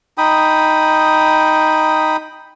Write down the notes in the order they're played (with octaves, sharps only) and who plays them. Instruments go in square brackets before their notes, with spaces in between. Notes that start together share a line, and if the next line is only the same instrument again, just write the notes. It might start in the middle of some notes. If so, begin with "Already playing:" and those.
[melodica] D#4 G5 B5 D#6